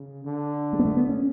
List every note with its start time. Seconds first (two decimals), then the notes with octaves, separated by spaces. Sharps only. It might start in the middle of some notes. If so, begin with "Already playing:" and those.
Already playing: C#3
0.25 D3
0.73 G#3
0.79 B3
0.85 A3
0.97 B3
1.09 C#4